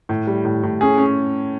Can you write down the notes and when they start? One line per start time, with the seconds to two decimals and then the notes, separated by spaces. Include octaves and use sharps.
0.09 A2
0.27 G3
0.45 A2
0.63 A2
0.81 C#4 G#4
0.98 C#4